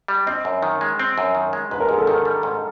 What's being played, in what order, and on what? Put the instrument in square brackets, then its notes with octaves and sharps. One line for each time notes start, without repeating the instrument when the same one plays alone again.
[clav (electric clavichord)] G3
[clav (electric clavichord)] C4 [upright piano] D#5
[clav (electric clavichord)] F#2
D#3
G#3
C4
F#2
D#3
G#3
[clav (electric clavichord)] G#2 [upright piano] B4
[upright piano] A#4
[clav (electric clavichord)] G#2 [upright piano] G#4
[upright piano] A4
[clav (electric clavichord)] D#3 [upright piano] A#4
[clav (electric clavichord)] G3
G#2